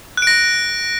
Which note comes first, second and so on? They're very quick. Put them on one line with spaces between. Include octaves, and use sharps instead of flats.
F#6 D7 A#6